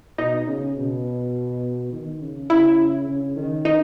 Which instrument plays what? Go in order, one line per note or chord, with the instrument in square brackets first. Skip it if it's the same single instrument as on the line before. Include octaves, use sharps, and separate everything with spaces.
[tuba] B2 [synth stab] D#4
[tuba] C#3
B2
D#3
C#3
[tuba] C#3 [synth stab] E4
[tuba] C#3
D#3
[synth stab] D#4